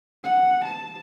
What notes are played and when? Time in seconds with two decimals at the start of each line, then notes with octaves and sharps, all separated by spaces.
0.24 F#5
0.65 A5